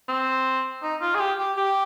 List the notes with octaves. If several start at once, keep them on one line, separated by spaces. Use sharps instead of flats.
C4
D#4
F4
G#4
G4
G4
G4